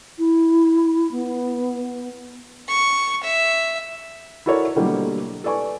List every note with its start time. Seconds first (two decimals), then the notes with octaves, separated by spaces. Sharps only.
0.19 E4
1.12 B3
2.68 C#6
3.24 E5
4.46 E4 F#4 A4 A#4 C#5 D5
4.76 B2 D3 F#3 G3 A3 A#3
5.44 A4 B4 D5 G#5 C#6